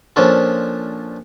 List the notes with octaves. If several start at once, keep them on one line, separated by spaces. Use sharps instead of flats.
A#2 F3 C#4 D4 F4 A4